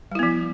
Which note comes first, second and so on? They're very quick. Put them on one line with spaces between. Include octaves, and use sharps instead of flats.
G3 E4 B3 F3